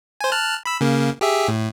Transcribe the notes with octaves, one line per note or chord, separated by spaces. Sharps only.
C5 G#5
A5 F6 F#6
B5 E6
C#3 A#3
G4 G#4 E5
A2